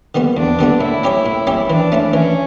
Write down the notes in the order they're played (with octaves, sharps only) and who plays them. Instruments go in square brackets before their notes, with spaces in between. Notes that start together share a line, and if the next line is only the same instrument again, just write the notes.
[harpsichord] D3 G3 B3 F#4
[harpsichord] E2 [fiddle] D4
[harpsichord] D3 G3 B3 F#4
[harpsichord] A2 [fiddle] E4
[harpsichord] G3 C#4 G4 C#5
A2
G3 C#4 G4 C#5
[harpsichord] E3 [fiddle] D4
[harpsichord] A3 C#4 E4
[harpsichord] E3 [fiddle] C#4